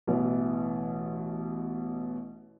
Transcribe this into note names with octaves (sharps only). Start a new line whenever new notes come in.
A1 B2 E3